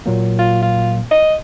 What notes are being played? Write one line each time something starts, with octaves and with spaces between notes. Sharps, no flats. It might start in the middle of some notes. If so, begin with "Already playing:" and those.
A#2 F#3 A#3
F4
F4
D#5